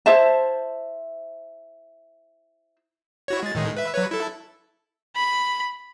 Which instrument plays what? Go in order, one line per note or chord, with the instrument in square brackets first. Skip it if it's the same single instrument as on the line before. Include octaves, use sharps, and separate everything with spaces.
[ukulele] E4 C5 E5 A5
[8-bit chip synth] E4 F#4 C#5
G#3 A6
A2 D#3 G#3
B4 E5
F#3 B4 C#5
E4 A4
[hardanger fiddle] B5